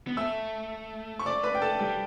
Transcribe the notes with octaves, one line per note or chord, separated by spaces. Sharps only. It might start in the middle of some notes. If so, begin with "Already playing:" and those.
B3
A3 E5 E6
C#6
D5 D6
B4 B5
G5
A4 A5
G3 G4 G5